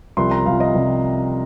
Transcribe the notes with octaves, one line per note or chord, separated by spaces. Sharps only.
C2 C3 F3 C6
A#5
C2 C3 F3 F5
D#5
C2 C3 F3